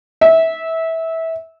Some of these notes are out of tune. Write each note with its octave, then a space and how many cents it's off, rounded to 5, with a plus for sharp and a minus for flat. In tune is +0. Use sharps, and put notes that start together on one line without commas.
E5 -20